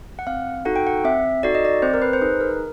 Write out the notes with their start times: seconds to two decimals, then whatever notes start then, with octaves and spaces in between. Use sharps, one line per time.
0.19 F#5
0.27 C4 F5
0.65 D#4 F#4 A4 F#5
0.76 G5
0.87 F#5
1.04 C4 E5
1.43 D#4 F#4 A4 D5
1.55 D#5
1.65 D5
1.82 C4 C5
1.94 A#4
2.02 B4
2.13 C5
2.22 D#4 G#4 B4
2.41 A#4